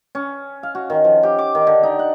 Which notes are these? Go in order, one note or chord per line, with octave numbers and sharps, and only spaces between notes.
C#4
F5
F#4
D#3
F3
G4
D6
D#3
D3
D#4
F#5